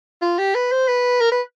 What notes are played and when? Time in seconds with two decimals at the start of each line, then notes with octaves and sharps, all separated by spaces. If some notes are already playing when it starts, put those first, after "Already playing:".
0.22 F4
0.38 G4
0.55 B4
0.72 C5
0.88 B4
1.21 A#4
1.32 B4